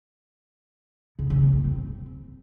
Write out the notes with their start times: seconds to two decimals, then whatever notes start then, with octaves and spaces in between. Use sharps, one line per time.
1.19 C#3
1.30 C#3
1.42 B3
1.53 A#3
1.65 C4